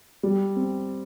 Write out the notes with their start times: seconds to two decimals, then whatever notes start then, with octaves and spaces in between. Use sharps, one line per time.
0.23 G3
0.56 C4